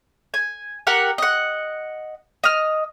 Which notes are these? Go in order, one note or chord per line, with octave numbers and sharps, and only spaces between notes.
G#5
G4 A#4 F#5
D#5 F#5
D#5 F6